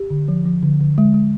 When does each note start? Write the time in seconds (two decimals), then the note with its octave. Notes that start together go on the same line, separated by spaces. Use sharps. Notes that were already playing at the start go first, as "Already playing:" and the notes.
Already playing: G4
0.10 D3
0.28 F3
0.45 F3
0.63 D3
0.80 D3
0.98 G#3
1.14 G#3